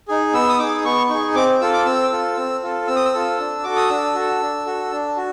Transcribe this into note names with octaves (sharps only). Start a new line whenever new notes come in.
D#4 G#4
B3 E6
D#6
D#4 G#4 D6
B3 C#6
D#4 G#4 C#6
C4 D6
F4 A4 E6
D6
C4 E6
F4 A4
C4
F4 A4
C4 E6
D#6
E6
F4 A4
D4
F#4 A4 D6
D#6
D4 E6
F#4 A4
D4
F#4 A4
D4
F#4